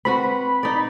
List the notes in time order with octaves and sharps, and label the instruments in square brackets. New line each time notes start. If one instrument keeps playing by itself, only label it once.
[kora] C4 F#4 B4 [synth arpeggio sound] B5
[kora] D#4 D5